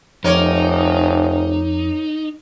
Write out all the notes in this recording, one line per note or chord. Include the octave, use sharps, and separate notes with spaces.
F1 F2 D#4 A#4 C#5 D6